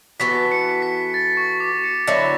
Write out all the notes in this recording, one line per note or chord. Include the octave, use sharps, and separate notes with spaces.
E3 B3 F#4 A4 B6
C#7
B6
A6
C#6
D6
C#7
D3 F#3 B3 E4 C#7